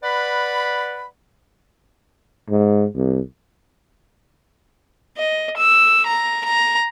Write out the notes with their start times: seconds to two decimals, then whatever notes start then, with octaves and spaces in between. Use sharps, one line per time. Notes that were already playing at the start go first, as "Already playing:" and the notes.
0.03 B4 D5 F#5 B5
2.50 G#2
2.95 C2
5.18 D#5
5.57 E6
6.07 A#5
6.44 A#5